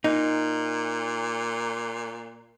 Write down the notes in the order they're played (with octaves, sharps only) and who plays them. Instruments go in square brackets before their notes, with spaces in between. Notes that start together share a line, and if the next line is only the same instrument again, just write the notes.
[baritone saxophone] A#2 [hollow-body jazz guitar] D#4